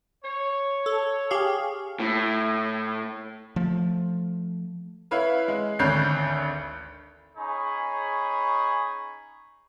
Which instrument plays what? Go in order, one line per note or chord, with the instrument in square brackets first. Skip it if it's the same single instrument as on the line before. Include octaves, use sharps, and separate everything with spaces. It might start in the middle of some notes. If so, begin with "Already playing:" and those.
[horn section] C#5
[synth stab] A4
G4 G#4 F5
[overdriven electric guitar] A2
[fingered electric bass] F3 A3
[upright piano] E4 B4 C#5 F5
G#3
G#1 D2 C#5 F#6 G6 C7
[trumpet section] C#4 D#4 G#4 B5 C#6